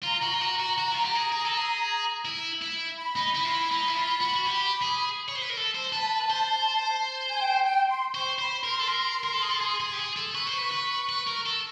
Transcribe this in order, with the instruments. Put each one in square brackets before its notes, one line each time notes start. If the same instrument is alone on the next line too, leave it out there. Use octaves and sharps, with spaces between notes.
[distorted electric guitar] F4 [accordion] A#5
[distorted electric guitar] F#4
F4
F#4
F#4
F#4
E4
F4
G4
G#4
G#4
A4
G#4
E4
E4
[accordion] B5
[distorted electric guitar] D#4
E4
F4
E4
D#4
E4
F4
F#4
F#4
G4
G#4
C#5
C5
B4
A#4
A4
C5
[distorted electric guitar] B4 [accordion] A5
[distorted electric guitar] C5
[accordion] G#5
G5
G5
C6
[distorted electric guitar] C5 [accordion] C#6
[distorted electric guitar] C5 [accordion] B5
[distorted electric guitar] A#4 [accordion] C6
[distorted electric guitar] A4
A#4
A#4
A4
G#4
A4
G#4
G#4
G4
G#4
A4
[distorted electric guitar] B4 [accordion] C#6
[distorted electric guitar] C5
B4
B4
B4
A#4
A4